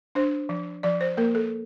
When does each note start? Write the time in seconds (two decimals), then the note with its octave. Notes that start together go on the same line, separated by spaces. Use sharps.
0.15 D4 C5
0.49 F3
0.83 F3 D5
1.01 C5
1.17 A#3 A#4
1.35 A4